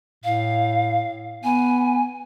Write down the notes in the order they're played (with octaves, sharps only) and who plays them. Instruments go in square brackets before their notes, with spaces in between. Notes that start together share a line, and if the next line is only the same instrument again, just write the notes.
[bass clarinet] A2 [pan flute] F5
[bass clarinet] B3 [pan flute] G#5